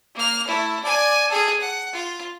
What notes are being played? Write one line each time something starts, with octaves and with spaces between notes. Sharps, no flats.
A#3 F6
A3 E4
D5 G#5
G#4 A4
F#5
F4